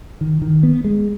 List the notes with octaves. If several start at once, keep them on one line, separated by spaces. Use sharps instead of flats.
D#3
D#3
B3
G#3